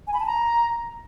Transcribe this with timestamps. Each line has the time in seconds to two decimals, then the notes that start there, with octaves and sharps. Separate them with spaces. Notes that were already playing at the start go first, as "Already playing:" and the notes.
0.07 G#5
0.14 B5
0.20 A5
0.26 A#5